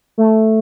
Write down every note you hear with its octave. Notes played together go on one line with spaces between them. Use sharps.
A3